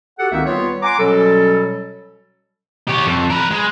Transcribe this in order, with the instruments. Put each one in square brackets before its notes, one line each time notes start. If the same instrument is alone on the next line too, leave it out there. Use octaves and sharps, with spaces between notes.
[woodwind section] F#4 G4 A4 F#5
C#2 D#3 A#3 C4 D#4 E5
G3 B3 F4 B4 C#5
F#5 G#5 A#5 C6 D6
B2 F#3 G3 C#4 A4
[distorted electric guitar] G4 C#5
F2
A#4 B4
G#3